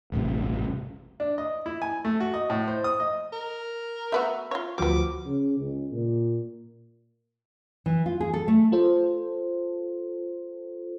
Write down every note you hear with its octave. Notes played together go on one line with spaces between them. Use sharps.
E1 A1 G2 C3
D4
D#5
E4
G#5
A3
F#4
D#5
A2
C5
D#6
D#5
A#4
A3 B3 F#4 E5
F4 C#5
D2 F3 G3 B3 F#4 D6
C#3
C#2
A#2
E3
F4
G#4
A4
A3
F4 A4 C5